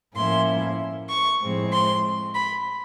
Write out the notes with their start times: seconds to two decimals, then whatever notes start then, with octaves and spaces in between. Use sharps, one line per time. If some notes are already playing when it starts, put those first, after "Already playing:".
0.16 A2 F3 A#3 C#4 E4 C6
1.09 C#6
1.41 A2 F3 G#3 C4
1.73 C6
2.35 B5